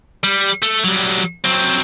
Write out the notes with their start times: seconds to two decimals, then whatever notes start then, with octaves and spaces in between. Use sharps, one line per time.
0.24 G3
0.63 A3
0.84 F#3 G3
1.44 F#3 C4